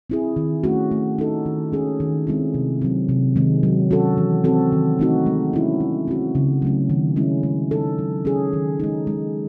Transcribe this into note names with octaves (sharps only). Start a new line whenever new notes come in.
C4 E4 G#4
D#3
A3 C#4 F#4
A3
D#4 A4
D#3
G#3 C#4 G#4
D#3
G#3 C4 E4
C3
F#3 C4
C3
D#3 G#3 C4
F#3
C#4 F#4 A4
E3
C4 F#4 A4
D#3
A3 C4 D#4 F#4
G#3
C#4 E4
G#3
C4 F#4
C#3
F#3 A3 C#4
D#3
G#3 C#4 E4
G#3
D#4 A4
F#3
C#4 G#4
D#3
G#3 D#4
G#3